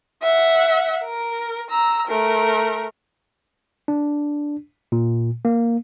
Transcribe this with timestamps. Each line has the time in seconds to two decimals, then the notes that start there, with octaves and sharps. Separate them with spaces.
0.23 E5 F#5
1.04 A#4
1.70 A#5 E6
2.08 A3 A#4
3.88 D4
4.92 A#2
5.45 A#3